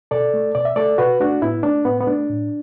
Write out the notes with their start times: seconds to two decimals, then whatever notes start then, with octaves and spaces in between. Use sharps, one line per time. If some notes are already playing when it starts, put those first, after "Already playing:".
0.11 B2 A4 D5
0.34 A3
0.55 B2 D5
0.65 E5
0.76 A3 A4 D5
0.98 B2 F#4 B4
1.20 A3 D4 F#4
1.42 A2 B3 E4
1.63 A3 D4
1.85 A2 B3
2.01 B3
2.07 A3 D4
2.29 A2